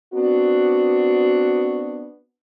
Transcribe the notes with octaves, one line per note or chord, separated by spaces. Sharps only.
B3 C4 D4 F#4